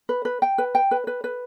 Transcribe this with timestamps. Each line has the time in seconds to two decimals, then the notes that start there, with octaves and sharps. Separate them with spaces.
0.09 B4
0.25 B4
0.42 G5
0.58 B4
0.75 G5
0.91 B4
1.07 B4
1.24 B4